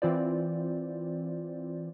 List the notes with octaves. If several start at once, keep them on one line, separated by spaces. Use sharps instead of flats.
E3 C4 F4 C5 D5